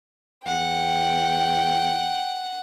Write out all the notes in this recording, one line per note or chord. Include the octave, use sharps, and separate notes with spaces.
E2 F#5 G5